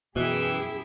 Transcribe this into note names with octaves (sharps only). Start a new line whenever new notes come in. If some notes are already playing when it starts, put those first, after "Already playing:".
F#2 B2 E3 E4 G4 G#4 E5 G5